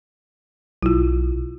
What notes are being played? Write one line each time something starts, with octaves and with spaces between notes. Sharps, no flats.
B1 E4 F4